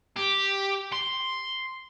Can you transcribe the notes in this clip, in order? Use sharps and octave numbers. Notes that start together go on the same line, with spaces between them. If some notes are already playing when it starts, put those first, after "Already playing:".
G4
C6